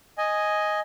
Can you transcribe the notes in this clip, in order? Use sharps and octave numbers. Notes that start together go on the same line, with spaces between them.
D#5 G#5